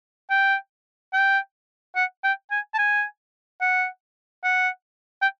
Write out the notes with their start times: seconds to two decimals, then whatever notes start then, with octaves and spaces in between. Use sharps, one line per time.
0.30 G5
1.14 G5
1.96 F#5
2.24 G5
2.51 G#5
2.74 A5
2.78 G#5
3.61 F#5
4.44 F#5
5.22 G5